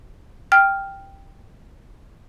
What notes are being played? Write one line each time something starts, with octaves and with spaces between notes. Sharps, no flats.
G5 F6